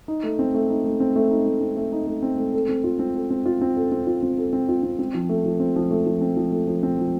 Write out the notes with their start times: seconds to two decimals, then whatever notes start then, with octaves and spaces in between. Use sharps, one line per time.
0.08 D#4
0.24 A3
0.39 C4
0.54 A3
0.69 D#4
0.84 A3
1.00 C4
1.16 A3
1.31 D#4
1.46 A3
1.61 C4
1.77 A3
1.92 D#4
2.07 A3
2.22 C4
2.38 A3
2.54 A4
2.69 C4
2.84 F4
2.99 C4
3.15 A4
3.30 C4
3.46 F4
3.61 C4
3.77 A4
3.92 C4
4.07 F4
4.23 C4
4.38 A4
4.53 C4
4.69 F4
4.83 C4
4.99 C4
5.14 F3
5.29 A3
5.45 F3
5.60 C4
5.76 F3
5.91 A3
6.06 F3
6.21 C4
6.37 F3
6.52 A3
6.67 F3
6.83 C4
6.98 F3